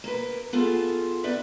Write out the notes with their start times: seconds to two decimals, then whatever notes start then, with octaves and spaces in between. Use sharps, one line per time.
0.04 A#3 B4
0.53 B3 F4 G#4 A4
1.24 B3 D#4 B4 D5 E5